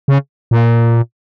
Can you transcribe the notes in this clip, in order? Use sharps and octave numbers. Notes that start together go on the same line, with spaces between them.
C#3
A#2